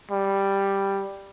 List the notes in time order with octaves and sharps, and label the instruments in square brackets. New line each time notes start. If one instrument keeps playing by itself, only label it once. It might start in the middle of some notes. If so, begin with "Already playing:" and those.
[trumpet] G3